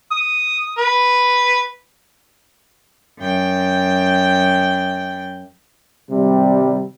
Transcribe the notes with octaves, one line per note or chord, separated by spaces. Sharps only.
D#6
B4
F#2 G5
G#1 C3 G3